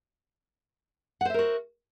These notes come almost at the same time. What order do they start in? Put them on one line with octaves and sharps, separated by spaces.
F#5 C5 E5 A#4 F#4